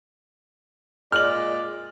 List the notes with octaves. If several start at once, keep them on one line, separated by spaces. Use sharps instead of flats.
A#2 G#3 D5 F6 F#7